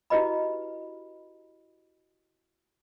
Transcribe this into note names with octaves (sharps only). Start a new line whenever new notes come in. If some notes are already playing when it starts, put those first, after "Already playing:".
E4 F#4 G4 B4 D#5 B5